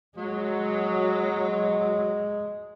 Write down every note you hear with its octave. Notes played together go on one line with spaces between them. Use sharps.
F#3 G#3